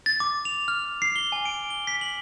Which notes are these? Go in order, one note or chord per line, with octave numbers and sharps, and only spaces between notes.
A6
D6
F7
F6
C7
G7
G#5
D7
G7
B6
F#7